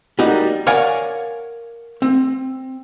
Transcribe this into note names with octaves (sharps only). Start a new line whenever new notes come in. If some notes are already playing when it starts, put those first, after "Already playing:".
G3 A#3 D#4 F#4
A#4 C#5 D5 F5 F#5 G#5
C4